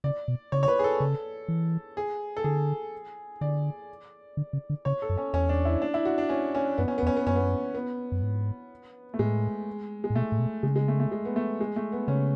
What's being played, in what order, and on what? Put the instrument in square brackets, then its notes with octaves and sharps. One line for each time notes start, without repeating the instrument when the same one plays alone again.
[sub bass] C#3 [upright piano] D5
[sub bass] B2
[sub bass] C#3 [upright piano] C#5
[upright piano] C#5
B4
G#4
A4
[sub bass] C#3
E3
[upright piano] G#4
A4
[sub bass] D3 [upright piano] G#4
[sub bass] D3 [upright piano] D5
[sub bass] D3
C#3
D3
[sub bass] C#3 [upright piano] C#5
[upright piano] A4
[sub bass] F#2
[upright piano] C#4
[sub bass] E2 [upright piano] C#4
[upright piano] D4
E4
D4
E4
F#4
D4
C#4
C#4
[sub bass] F#2 [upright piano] B3
[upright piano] C#4
B3
[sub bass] E2
[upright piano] C#4
B3
[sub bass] F#2 [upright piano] C#4
[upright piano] B3
B3
[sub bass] F#2
G#2
[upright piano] A3
[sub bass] A2 [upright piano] G#3
[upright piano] G#3
[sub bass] A2
[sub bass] B2 [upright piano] A3
[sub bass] A2
B2
[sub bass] C#3 [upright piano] G#3
[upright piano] G#3
A3
A3
G#3
B3
A3
G#3
A3
B3
[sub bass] C#3 [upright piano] C#4